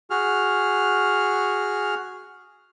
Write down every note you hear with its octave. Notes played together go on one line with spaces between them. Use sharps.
F#4 G#4 F6